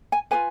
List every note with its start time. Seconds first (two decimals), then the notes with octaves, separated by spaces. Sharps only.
0.12 G#5
0.31 F4 G#4 B4 G#5